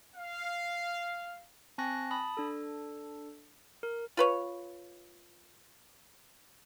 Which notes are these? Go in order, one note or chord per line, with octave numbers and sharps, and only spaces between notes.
F5
C4 G#5 A5 C#6 F#6 A#6
A5 B5 D#6
D4 A4
A#4
F4 B4 C#5